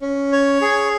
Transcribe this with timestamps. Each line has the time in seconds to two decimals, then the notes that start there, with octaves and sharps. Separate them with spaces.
0.02 C#4
0.32 C#5
0.61 G#4